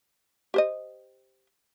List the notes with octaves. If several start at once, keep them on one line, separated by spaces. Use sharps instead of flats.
G4 C5 D#5